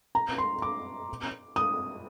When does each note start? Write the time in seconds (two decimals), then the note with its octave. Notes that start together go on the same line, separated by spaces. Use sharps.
0.15 A#5
0.38 C6
0.62 D6
1.56 D#6